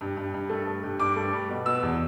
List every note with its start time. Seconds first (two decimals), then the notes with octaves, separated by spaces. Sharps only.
0.01 G2
0.17 G2
0.34 G2
0.50 A3
0.67 G2
0.83 G2
0.99 G2 D6
1.16 A3
1.33 G3
1.49 B2
1.66 B2 E6
1.83 E2